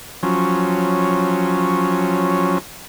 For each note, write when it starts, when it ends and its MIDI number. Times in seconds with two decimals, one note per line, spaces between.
0.23 2.58 53
0.23 2.58 54
0.23 2.58 61